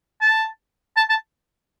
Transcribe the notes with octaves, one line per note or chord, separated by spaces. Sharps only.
A5
A5
A5